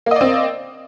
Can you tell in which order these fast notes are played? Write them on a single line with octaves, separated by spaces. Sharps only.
A#3 D#5 D5 C4